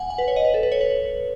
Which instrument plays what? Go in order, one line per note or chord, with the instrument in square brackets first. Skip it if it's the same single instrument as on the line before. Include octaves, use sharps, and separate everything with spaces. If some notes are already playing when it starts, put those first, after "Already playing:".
Already playing: [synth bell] F#5 G#5
F#5
B4
C#5
D#5
B4
A4
B4
C#5
B4